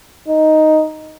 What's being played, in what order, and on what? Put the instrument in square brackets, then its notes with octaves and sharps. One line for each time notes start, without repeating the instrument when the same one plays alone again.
[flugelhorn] D#4